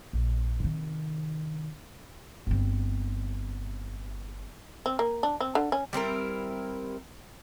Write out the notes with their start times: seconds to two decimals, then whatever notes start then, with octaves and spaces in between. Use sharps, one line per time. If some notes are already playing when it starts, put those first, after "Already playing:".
0.13 A#1
0.60 C3 D#3
2.47 G1 C4
4.86 C4
4.99 A#3
5.23 D4
5.40 C4
5.55 D3
5.72 C#4
5.93 G3 C4 E4 A#4